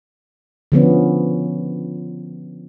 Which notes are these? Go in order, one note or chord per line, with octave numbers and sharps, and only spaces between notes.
D3 F3 B3 C#4